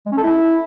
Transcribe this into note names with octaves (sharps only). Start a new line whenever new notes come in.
G#3
C#4
A4
E4